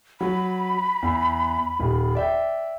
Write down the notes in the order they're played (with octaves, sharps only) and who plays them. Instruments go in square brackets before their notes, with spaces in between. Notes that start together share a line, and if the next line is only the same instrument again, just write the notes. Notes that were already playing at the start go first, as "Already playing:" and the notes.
[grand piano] F#3 [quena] B5
[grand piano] E2
D#1
D5 E5 G5